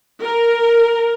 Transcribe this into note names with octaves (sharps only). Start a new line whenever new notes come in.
A#4